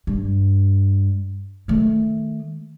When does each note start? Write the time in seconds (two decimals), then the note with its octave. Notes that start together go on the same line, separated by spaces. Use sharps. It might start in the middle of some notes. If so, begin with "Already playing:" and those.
0.07 G2
1.68 D#3 A3